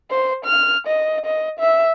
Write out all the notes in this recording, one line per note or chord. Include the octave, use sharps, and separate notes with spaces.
C5
F6
D#5
D#5
E5